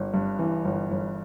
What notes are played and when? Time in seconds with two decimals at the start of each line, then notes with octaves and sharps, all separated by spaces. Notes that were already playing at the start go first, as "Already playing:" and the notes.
Already playing: G1
0.14 G2
0.39 E3
0.65 G1
0.91 G1